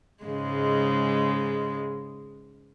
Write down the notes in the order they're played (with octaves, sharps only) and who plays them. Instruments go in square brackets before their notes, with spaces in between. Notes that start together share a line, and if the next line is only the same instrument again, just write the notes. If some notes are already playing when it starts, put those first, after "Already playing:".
[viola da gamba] G#2 C#3 G#3